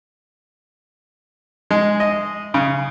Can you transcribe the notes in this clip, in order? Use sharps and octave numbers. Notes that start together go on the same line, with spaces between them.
G#3
D#5
C#3